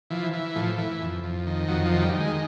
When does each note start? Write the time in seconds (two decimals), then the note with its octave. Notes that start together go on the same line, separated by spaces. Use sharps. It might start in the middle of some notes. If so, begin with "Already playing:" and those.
0.10 E3 F3
0.33 E3
0.55 A2 F3
0.78 E3
1.01 F2
1.24 F2
1.47 D#3
1.68 F2 F#3
1.85 F3
1.92 D#3 F#3
2.02 G3
2.14 D#3
2.20 G#3